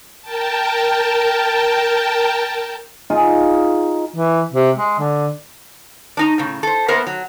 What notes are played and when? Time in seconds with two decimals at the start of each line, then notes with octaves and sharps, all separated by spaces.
0.22 A#4 G5 A5
3.10 D#4 F4 G#4 F5
4.14 E3
4.53 C3
4.77 G#3
4.99 D3
6.17 D4 D#4 A#5
6.38 A2 C#3
6.63 A4 C5
6.88 A#3 B3 A#4 C5 E5
7.07 F#3